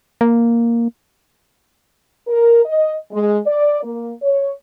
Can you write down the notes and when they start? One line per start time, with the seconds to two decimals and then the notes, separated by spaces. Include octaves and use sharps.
0.21 A#3
2.27 A#4
2.65 D#5
3.11 G#3
3.46 D5
3.83 A#3
4.22 C#5